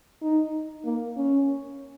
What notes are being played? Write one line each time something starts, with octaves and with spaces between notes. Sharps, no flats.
D#4
A#3
C#4